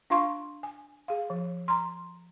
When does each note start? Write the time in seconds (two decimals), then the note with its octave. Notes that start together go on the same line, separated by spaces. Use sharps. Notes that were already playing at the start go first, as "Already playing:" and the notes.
0.10 D4 F4 F5 C6 C#6
0.63 G#5
1.08 G#4 F5
1.30 F3
1.68 A#5 C6